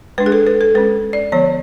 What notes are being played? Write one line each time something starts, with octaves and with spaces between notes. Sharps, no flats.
G#3 D4 B4
G#4
A4
B4
A4
G#3 C#4 B4
D5
D3 F3 B3 C#5